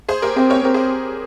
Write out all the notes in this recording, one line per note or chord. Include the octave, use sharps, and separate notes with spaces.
G#4 C5
G4 A#4
C4 G#4 C5
A#4 C#5
C4 G4 A#4
G#4 C5